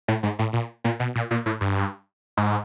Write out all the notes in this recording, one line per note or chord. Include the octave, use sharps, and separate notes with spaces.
A2
G#2
A2
A#2
A#2
B2
A#2
A#2
A2
G2
G#2